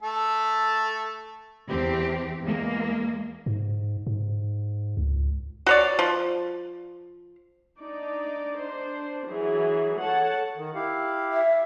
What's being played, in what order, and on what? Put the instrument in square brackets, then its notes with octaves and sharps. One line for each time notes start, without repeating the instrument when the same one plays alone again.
[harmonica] A3 A4
[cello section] E2 C4 G4
E2 G#3 A#3
[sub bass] G#2
G#2
C#2
[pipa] F#4 C#5 D5
F3
[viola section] D4 D#4 D5
D4 C5
E3 F#3 G#4
A4 C#5 F#5 A5
[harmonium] D#3
E4 G4 F5
[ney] E5